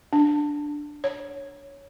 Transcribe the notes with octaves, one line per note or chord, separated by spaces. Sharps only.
D4
C#5